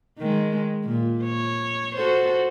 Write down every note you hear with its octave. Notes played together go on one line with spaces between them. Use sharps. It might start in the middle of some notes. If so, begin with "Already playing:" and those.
D#3 G#3
A#2
C#5
F#4 A4 C5